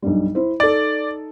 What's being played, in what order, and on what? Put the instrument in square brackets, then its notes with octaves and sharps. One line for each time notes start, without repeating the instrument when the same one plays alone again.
[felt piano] B1 G2 G3
E4 C5
[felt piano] D#4 A4 [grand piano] D5